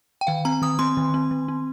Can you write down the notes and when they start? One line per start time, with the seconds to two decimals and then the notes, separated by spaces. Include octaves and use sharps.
0.21 G5
0.27 D#3 F5
0.45 C4 A#5
0.62 D#3 D#6
0.79 C4 C6
0.97 D#3
1.14 C4
1.31 D#3
1.48 C4